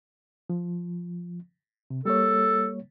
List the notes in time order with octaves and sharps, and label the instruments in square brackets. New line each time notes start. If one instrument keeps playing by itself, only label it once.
[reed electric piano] F3
C3
[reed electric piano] G3 A#3 C#5 [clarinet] A4